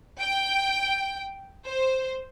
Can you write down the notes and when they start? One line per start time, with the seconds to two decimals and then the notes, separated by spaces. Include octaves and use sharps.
0.20 G5
1.67 C5